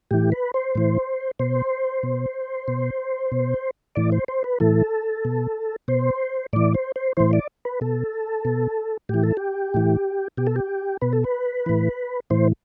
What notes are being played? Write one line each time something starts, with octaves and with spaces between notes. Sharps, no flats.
A2 E3 G4
B4
C5
A2 E3
B2 C5
B2
B2
B2
A2 E3 D5
C5
C5
B4
A2 E3 A4
B2
B2 C5
A2 E3 D5
C5
C5
A2 E3 C5
D5
B4
B2 A4
B2
A2 E3 G4
A4
G4
A2 E3
B2 G4
A4
G4
B2 B4
A4
B4
A2 E3
A2 E3 C5